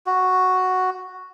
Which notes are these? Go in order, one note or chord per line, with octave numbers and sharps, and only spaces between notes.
F#4